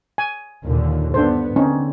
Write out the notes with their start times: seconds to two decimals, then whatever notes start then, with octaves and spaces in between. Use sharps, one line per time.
0.18 G#5
0.65 D#2 A#2 D3
1.14 G2 B3 D4 A4 C5
1.56 D3 C4 C#4 D#4